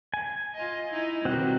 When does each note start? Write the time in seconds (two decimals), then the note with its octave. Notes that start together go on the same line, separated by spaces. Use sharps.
0.14 G#5
0.55 F4 D#5
0.89 D#4 E4
1.25 B2 D#3 G3 C4 F#4